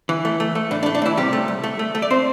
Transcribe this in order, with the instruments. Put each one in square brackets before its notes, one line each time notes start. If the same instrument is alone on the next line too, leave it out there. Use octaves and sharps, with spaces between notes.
[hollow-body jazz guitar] E3
A3
A3
A3
A2 D4
D4
A3
D4
A2 E3 E4
C3 G3 G4
A3
C2
A3
A3
A3
D5
C4 C5